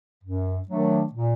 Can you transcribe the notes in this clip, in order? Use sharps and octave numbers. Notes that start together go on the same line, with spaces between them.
F#2
D#3 F#3 A3 D4
A#2